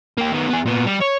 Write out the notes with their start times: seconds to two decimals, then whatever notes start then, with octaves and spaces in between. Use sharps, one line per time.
0.18 A#3 G4
0.33 D#3 B3
0.49 B3 G#4
0.66 A#2 B3
0.86 G3
1.00 C#5